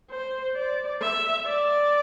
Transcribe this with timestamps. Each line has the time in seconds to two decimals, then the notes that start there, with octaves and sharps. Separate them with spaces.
0.10 C5
0.56 D5
1.01 E5
1.46 D5